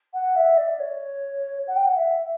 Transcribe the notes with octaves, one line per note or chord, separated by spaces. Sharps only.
F#5
E5
D5
C#5
F#5
G5
F#5
E5